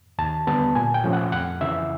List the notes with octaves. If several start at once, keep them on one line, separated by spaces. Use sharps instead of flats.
D#2 A5
D3 G3 B3 A5
A#2 G#5
G5
F3 A3 C#4
F#5
F2 F#5
C#3 E3 E5